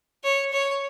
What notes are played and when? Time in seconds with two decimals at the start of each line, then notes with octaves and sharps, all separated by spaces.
0.24 C#5
0.52 C#5